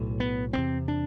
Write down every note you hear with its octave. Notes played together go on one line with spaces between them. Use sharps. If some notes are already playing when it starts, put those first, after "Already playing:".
Already playing: B1 A2
B3
E1 E2 C3 C4
D4